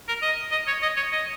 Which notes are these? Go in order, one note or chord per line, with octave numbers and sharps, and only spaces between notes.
A#4
D#5
D#5
C#5
D#5
C#5
D#5